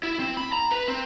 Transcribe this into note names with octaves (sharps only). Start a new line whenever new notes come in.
E4
C4
B5
A#5
B4
C4